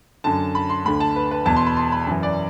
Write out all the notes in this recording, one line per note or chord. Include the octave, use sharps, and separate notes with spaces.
F#2 D3 A5
B5
C6
D2 D3 B5
A5
B4
B4
E2 B2 A5
C6
B5
C6
B5
F#2 E3
D5